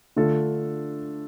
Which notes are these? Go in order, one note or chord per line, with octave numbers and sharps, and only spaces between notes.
D3 A3 D4 F4 A4